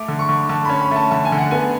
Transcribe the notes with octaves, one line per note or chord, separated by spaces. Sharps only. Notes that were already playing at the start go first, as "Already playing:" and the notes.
Already playing: A3 D6
D3
C#6
D3
D3 A5
C#4 B5
B5
A3 A5
D3 A5
G#5
D3
F#5
B3 G#5